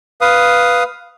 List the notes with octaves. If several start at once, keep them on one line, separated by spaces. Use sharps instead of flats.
B4 F5 D#6